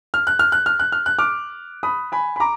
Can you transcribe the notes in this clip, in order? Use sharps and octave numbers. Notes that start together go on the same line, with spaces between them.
F6
F#6
F6
F#6
F6
F#6
F6
F#6
D6 F6
B5 D#6
G#5 B5
B5
A#5 D6